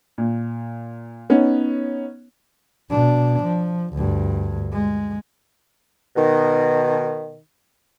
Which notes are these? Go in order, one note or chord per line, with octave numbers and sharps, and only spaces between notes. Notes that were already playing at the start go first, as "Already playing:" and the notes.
A#2
B3 C#4 D#4
B2 D4
F3
D2 G2
G#3
B2 D#3